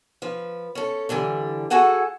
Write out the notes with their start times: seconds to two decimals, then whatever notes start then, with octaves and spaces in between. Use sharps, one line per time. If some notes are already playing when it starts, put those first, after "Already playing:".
0.22 F3 B4
0.75 C#4 A4
1.09 D3 E3 G3 D4
1.70 F#4 G#4 A4 F#5 G#5